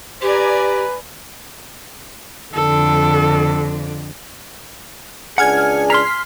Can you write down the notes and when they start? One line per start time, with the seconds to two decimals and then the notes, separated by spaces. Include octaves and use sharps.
0.22 G4 B4 D5 G#5 A#5
2.54 F2 D3 A4
5.38 C#2 D4 G#4 F#5 G#5 F6 G#6
5.90 A#5 C6 F6 B6 C7